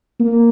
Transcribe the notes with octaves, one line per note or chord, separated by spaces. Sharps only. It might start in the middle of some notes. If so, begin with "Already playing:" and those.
A#3